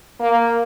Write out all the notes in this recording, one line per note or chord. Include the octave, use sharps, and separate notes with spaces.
A#3